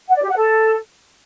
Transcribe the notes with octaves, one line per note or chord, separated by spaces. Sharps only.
F#5
D5
G4
F#5
A4